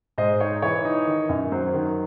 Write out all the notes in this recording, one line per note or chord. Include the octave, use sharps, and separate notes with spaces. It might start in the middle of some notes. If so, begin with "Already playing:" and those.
G#2 C5 D#5
D#4 C#5
E3 C#5
D#4
D#3
F#2
F#3 C5
D#3